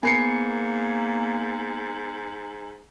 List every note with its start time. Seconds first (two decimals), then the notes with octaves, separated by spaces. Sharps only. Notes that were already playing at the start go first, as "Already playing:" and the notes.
0.03 G#2 A#3 B3 A#4 G#5 C7 C#7